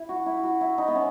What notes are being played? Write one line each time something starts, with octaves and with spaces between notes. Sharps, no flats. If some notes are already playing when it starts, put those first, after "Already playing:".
Already playing: E4
F#4
E4
F#4
E4
D#4
B3
C#4